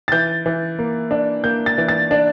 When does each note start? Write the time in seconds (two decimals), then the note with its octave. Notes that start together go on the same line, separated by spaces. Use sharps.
0.08 A6
0.12 E3 G6
0.46 E3
0.79 A#3
1.11 D4
1.44 A#3 G6
1.66 A6
1.78 E3
1.89 A6
2.11 D4